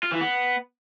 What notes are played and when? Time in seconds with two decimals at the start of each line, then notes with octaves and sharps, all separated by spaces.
0.03 F4
0.12 E3
0.21 B3